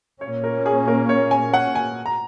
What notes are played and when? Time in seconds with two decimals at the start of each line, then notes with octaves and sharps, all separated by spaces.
0.21 A#2 A#3 C#4 C#5
0.44 A#4
0.66 G#4
0.88 A#4
1.09 C#5
1.31 G#5
1.53 F#5
1.75 G#5
2.06 A#5